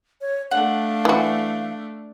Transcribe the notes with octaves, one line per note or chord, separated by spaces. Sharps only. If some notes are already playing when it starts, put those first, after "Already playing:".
C#5
A3 D4 F5 F#5
E3 F#4